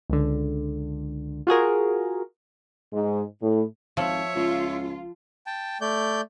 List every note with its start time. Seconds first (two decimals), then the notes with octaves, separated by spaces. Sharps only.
0.10 C#2 D3
1.47 F4 F#4 G#4 A#4
2.93 G#2
3.42 A2
3.97 G#1 F3 C#5 E5
4.35 C#2 F4
5.46 G5 A5
5.81 A3 D5 G6